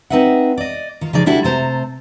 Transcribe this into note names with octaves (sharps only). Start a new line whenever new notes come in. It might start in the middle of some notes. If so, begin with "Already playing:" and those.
C4 D#4 B4 E5 F#5
D5 D#5
D#3 F4
C#3 F3 D#4 G#4 D5
G3 D4 E4 F#4 A4
C3 A3 C5 A5 A#5